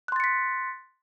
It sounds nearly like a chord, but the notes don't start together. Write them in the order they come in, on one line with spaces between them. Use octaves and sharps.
F#6 C6 A6 C#7 B6